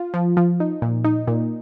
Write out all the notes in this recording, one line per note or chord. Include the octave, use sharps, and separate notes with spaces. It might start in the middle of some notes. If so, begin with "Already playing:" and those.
Already playing: F4
F3
F3
D#4
A#2
D#4
A#2